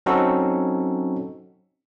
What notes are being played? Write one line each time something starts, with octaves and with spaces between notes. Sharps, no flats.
F#3 C4 C#4 D#4 F#4 A4